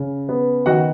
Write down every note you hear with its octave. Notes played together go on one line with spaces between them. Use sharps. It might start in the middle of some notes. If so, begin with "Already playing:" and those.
Already playing: C#3
B3
D#3 F#4 F#5